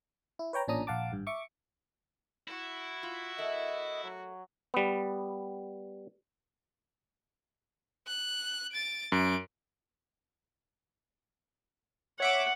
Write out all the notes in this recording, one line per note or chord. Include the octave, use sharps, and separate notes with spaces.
E4
B4 C#5 G5 A#5
A1 A#2 C#4 D4 A#5 D#6
A#1 F5 F#5 A5 D6
G#1 G2
E5 C#6 D6
E4 F#4
F4
A3 A#4 D#5 E5
F#3
G3 B3
F#6
A6 D7
F#2 D7
C#5 E5 F#5 D6